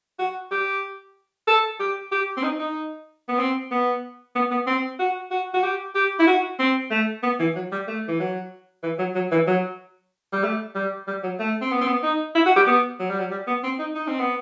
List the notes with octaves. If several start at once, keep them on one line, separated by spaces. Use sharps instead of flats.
F#4
G4
A4
G4
G4
C4
D#4
D#4
B3
C4
B3
B3
B3
C4
F#4
F#4
F#4
G4
G4
E4
F#4
C4
A3
B3
E3
F#3
G3
A3
E3
F#3
E3
F#3
F#3
E3
F#3
G3
A3
G3
G3
F#3
A3
C4
B3
C4
B3
D#4
E4
F#4
G4
B3
F#3
G3
F#3
G3
B3
C4
D#4
D#4
C4
B3